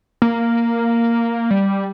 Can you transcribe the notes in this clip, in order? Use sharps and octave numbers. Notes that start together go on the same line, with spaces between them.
A#3
G3